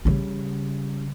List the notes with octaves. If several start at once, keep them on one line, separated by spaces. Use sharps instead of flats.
C#3 G3